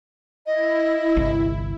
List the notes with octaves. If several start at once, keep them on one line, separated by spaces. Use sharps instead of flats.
E4 D#5
G1 C2